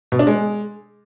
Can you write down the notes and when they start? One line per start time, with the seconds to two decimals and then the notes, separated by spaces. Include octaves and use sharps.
0.12 B2
0.19 D4
0.27 G#3